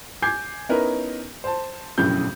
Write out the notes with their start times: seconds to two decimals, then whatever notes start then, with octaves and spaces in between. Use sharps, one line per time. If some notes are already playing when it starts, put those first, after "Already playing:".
0.22 G#5 D6 G6 G#6 C7
0.69 B3 C#4 D#4 E4 A#4 B4
1.44 C5 A5
1.98 E1 A#1 F#2 A2 C#3 G6